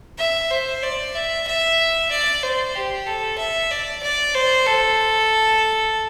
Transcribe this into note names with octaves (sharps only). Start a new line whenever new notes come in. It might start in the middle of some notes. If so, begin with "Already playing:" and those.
E5
C5
D5
E5
E5
D5
C5
G4
A4
E5
D5
D5
C5
A4